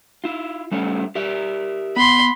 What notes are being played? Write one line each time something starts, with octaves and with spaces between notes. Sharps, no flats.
E4 F4
G3 A3 C#4
G4 A#4 E5
B3 B5 C6